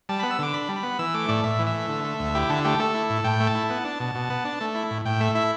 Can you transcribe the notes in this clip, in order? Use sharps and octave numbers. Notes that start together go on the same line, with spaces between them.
G3 A5
B3 B5
E6
D3 D6
D4 B5
G3
B5
B3
E3 E6
A3 D6
A2 D5
A2 E5
E3
E5
A3
D3
A3
D2
E4 G4
D3 A4
A3 G4
A3 A4
E4
A2
A2 G5
A3
A5
E4
B3
D4
B2
B2
B3
D4
A3
E4
A2
A2 G5
A3 E5
E4 E5